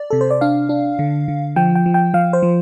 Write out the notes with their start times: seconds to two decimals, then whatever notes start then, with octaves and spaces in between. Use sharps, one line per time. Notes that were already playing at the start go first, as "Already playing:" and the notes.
Already playing: D5
0.10 C3 A4
0.21 C5
0.31 D5
0.41 D4 F5
0.69 D4
0.99 D3
1.28 D3
1.56 F3 G5
1.75 G5
1.86 F3
1.94 G5
2.14 F3 F5
2.33 C5
2.43 F3